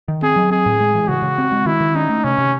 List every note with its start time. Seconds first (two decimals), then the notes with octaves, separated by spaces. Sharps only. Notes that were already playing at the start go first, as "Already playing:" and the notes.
0.08 D#3
0.22 C4 G#4
0.36 F#3
0.50 C4 G#4
0.66 A2
0.80 G#3
0.94 E3
1.08 C#3 F#4
1.23 C#3
1.38 C4
1.52 G#3
1.66 D#3 E4
1.81 D#3
1.95 C#4 D#4
2.09 A3
2.24 C3 C#4
2.38 C3